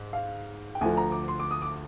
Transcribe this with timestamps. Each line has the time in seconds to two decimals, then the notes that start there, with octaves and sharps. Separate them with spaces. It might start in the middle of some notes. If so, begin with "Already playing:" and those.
Already playing: G#2
0.13 F5
0.75 G5
0.81 D2 D3 F3 G#5
0.97 A#5
1.12 D6
1.28 C6
1.39 D6
1.51 D#6
1.62 D6